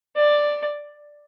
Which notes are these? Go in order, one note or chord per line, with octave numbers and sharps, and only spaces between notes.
D5